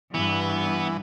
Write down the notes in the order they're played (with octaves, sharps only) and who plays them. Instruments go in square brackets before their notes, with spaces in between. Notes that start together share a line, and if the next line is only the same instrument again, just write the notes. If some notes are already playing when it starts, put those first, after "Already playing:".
[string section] G2 [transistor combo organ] E3 [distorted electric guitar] B3